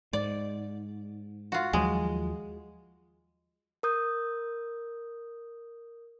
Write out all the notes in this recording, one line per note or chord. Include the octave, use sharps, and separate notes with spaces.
G#2 D5
F4 F#4
D#2 F3 F#3 G#3
A#4 D#6 G6